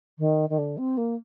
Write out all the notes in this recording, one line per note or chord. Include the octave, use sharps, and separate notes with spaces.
D#3
D#3
D3
C4
A#3